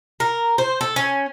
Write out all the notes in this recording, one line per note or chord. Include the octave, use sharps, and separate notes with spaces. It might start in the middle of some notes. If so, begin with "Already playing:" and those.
A#4
C5
A4
C#4